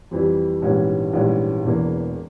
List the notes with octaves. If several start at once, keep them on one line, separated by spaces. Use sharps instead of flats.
F2 E3 G3
A#1 G#2 E3 G3 C#4
A#1 G#2 E3 G3 C#4
E1 E2 E3 A#3